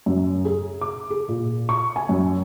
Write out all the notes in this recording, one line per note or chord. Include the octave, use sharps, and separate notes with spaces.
F#2
G#4
D6
G#4
A#2
C#6
G#5
F#2